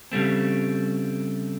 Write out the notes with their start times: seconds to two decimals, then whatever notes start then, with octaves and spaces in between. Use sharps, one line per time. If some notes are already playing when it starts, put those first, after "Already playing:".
0.12 C#3 G3 A3 C4